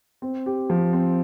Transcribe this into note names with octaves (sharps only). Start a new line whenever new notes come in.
C4
G4
F3
C4